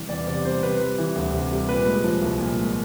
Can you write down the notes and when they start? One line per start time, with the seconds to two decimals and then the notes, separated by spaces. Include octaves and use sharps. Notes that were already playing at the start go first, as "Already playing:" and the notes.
Already playing: C3 E3 G3
0.09 E2 D5
0.27 C3 D5
0.45 G3 C5
0.62 C3 B4
0.80 G3
0.98 E3
1.16 D2
1.33 C3
1.51 G3
1.68 A#2 B4
1.87 G#3
2.04 F3
2.22 C2
2.39 A#2
2.58 G#3